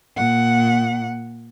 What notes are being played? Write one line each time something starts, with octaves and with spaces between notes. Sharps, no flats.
A#2 F#5